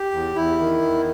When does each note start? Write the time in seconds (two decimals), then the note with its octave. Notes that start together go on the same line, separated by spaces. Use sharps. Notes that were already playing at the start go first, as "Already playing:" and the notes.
Already playing: G4
0.11 E2
0.36 E2 E4
0.58 D#3
0.82 E2